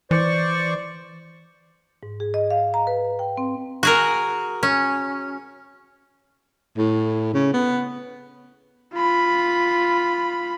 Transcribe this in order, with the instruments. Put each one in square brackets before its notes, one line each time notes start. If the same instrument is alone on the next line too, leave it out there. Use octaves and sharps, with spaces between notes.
[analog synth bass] E3 [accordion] C5 D5 C#6
[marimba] G#2
G#4
D#5
F5
A#5
B4
G5
C4
[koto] F#4 G#4 A#4
C#4
[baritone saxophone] A2
C#3
B3
[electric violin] F4 B5